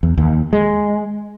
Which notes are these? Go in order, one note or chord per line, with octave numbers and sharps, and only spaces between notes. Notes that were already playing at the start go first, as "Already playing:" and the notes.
E2
D#2
G#3